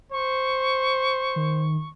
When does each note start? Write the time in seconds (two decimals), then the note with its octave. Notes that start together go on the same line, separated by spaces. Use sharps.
0.12 C5 C#6
1.36 D#3